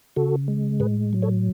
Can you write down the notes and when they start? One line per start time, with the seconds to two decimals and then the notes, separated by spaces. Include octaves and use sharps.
0.16 C#3 F#4 A4
0.48 G#3
0.80 A2 G#4 B4
1.13 F#3
1.22 A4 C#5